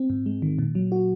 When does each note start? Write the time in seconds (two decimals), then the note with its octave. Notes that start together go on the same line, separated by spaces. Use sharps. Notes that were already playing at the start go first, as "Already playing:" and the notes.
Already playing: C4
0.10 G#2
0.26 G#3
0.42 D#3
0.59 A#2
0.75 F#3
0.92 F#4